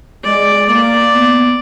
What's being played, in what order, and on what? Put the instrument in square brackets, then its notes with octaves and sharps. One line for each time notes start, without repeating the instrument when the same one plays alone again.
[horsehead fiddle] G#3 [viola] D5
[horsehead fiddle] A#3 [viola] D5
[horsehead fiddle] B3